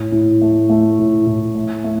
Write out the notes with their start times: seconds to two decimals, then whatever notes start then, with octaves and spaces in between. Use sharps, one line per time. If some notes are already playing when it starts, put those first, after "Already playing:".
Already playing: A2
0.12 A2
0.41 A3
0.70 A3
0.99 A2
1.26 A2
1.55 A3
1.84 A3